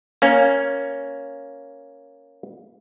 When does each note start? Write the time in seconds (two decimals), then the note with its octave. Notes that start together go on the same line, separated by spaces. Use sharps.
0.22 A#3 C#4